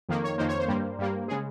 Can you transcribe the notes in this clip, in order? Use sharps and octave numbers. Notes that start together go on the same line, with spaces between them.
F2 D#3 A#3
C#5
F2 D#3 A#3 C5
C#5
C5
G2 G3 A#3
G2 G3 A#3
C#3 G#3 G#4